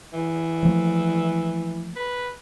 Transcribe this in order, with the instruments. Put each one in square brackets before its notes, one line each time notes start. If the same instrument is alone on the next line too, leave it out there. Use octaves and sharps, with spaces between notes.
[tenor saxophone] E3
[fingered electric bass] F3 A3 A#3
[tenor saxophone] B4